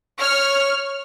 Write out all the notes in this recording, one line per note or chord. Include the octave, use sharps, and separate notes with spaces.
C#5 F6